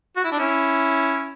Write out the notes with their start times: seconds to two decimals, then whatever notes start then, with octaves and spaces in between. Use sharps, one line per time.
0.17 F#4
0.24 E4
0.32 D4
0.39 C#4 E4